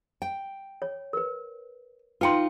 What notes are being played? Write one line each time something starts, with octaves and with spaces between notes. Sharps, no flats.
G5
C#5
A#4 B4
D#4 F4 B4 G5 C6